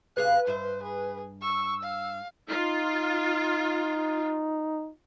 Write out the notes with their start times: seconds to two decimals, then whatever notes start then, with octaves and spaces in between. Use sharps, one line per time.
0.17 C3 G#4 B4 F5 F#6
0.47 G2 C5 D#5 E5
0.83 G#4
1.42 C#6 E6
1.83 F5
2.49 D#4 F4